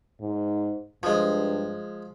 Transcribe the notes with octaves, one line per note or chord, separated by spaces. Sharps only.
G#2
G2 F3 G#3